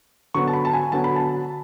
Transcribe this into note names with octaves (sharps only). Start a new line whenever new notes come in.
D3 F#3 B3 C#6
A5
B5
A5
G#5
D3 F#3 B3 A5
B5
A5